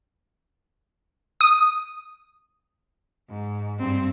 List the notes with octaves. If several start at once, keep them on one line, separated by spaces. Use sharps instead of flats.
D#6
G#2
G2 C4